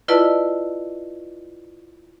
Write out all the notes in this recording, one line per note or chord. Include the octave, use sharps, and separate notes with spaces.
E4 F4 B4 D5 D#5 A5